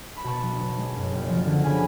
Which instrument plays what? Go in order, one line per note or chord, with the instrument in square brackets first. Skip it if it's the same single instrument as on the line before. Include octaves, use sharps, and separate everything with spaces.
[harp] B5
B2 A5 C#6
B1
B1
G#3
F#2
F#1
F3
D3
C#3 G#5 B5